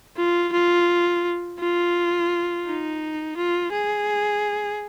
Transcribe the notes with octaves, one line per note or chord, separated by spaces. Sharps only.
F4
F4
F4
D#4
F4
G#4